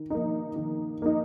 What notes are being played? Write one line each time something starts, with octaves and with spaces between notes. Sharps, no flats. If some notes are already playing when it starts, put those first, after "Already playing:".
Already playing: D#3
A#3 D#4
D#3
A#3 D#4